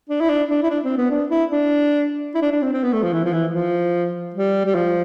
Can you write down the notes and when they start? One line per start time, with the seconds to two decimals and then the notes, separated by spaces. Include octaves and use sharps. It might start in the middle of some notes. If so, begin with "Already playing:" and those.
0.10 D4
0.21 E4
0.29 D4
0.51 D4
0.63 E4
0.70 D4
0.85 C4
0.98 B3
1.11 D4
1.31 E4
1.51 D4
2.35 E4
2.42 D4
2.52 D4
2.62 C4
2.73 C4
2.84 B3
2.93 A3
3.03 F3
3.13 E3
3.25 F3
3.33 E3
3.54 F3
4.35 G3
4.65 G3
4.75 F3